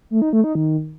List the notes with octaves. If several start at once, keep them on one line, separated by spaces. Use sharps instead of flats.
A3
D#4
A3
D#4
D#3